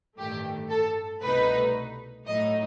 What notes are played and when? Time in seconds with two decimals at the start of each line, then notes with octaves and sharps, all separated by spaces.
0.17 A1 G2 D#3 A3 G4
0.70 A4
1.22 C2 B2 A3 D#4 B4
2.27 A2 F#3 A3 D#4 D#5